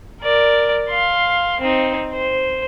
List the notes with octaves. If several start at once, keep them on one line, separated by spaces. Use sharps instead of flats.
A#4 D5
F5 C6
C4 D#4
C5